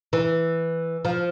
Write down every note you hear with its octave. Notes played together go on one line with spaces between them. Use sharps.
E3
F3